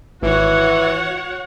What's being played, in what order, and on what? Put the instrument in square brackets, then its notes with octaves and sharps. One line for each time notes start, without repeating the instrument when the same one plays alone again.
[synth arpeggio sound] G#1 [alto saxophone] E3 [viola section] F#4 C#5 F#5